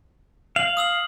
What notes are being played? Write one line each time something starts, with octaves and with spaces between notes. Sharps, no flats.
F5 F#7
D#6 E6 F#7